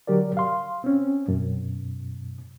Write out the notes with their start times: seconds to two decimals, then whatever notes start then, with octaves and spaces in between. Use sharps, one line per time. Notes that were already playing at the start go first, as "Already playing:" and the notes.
0.07 D3 F#3 G4 A#4 D5
0.37 F5 C6
0.84 C4 C#4
1.28 F#2 B2